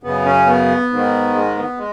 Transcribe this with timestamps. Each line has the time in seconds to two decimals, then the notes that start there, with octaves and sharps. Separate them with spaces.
0.03 F#2 C#3 B3
0.25 C#4
0.46 B3
0.90 G#2 D#3
1.34 G#3
1.56 B3
1.78 G#3